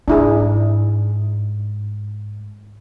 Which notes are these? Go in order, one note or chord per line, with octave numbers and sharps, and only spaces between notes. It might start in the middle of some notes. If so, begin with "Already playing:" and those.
G#2 D4 E4 G#4